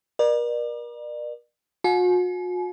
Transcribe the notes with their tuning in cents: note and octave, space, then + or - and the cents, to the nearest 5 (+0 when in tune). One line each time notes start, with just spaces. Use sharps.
A#4 +40 D5 +35
F#4 -45 G#5 +40